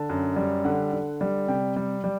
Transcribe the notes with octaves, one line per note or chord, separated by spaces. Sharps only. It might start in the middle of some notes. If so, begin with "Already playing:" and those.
Already playing: D3 A5
F#2
G3
D3 F#5
D3
G3
C3 G5
G3
G3